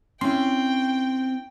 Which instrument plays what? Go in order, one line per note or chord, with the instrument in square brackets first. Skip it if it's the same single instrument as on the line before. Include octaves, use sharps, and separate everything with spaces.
[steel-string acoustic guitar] C4 [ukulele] C#4 E4 [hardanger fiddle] G5 [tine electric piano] C6